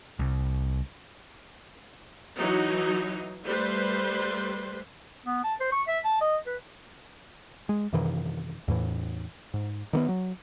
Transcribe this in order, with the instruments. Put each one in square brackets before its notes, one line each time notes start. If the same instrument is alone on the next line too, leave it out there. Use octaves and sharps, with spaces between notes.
[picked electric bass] C2
[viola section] E3 F#3 D#4
G3 A3 B4 C5 C6
[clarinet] B3
A5
C5
C#6
E5
A5
D#5
B4
[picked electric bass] G#3
F#2 C3 D#3 E3
E2 A2 E3
G#2
D#3 A#3 B3
F#3